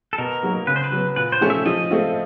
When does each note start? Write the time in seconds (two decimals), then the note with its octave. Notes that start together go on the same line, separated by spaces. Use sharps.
0.13 A4
0.18 B2 A#4
0.43 F#3 A#3 D#4 F#4
0.67 C#3 B4
0.76 C5
0.84 B4
0.92 F#3 B3
1.16 A#2 B4
1.32 C5
1.41 F3 A3 C#4
1.50 E5
1.66 F3 D#5
1.90 A3 C4 F4